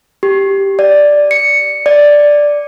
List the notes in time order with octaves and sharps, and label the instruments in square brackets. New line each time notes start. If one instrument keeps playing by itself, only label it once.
[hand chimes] G4
D5
C#7
D5